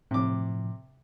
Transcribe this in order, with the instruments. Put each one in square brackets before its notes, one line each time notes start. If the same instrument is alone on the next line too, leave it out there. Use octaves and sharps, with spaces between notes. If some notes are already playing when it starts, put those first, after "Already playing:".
[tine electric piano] A2 F3 [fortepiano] C3 D6